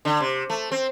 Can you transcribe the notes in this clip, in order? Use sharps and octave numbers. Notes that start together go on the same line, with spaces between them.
D3
C3
A3
C4